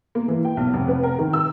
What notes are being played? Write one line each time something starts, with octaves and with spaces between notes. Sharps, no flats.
A#3
E3
G5
B1
F1
B4
A#4
D#3
E6